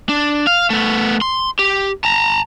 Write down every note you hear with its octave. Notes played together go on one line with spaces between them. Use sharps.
D4
F5
A3 B3
C6
G4
A5 A#5